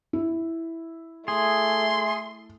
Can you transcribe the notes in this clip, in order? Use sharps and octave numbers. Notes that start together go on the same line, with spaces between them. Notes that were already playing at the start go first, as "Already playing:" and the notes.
E4
A3 G#4 C6